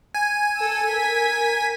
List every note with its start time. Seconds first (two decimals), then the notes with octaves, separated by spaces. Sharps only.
0.15 G#5
0.57 A4 E6
0.89 A#4 G#6 B6